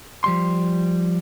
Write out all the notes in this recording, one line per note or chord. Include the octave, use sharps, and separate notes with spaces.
F3 G3 C6